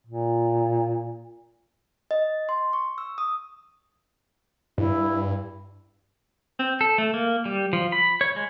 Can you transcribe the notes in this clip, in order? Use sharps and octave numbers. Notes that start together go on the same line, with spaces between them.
A#2
D#5
C6
C#6
E6
D#6
G2 E4
C4
A4
A3
A#3
G3
F3
B5
C#5
G#3